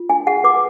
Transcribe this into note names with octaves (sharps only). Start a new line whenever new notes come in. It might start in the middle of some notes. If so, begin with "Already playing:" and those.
Already playing: F4
D4 G#5
G#4 F#5
B4 D6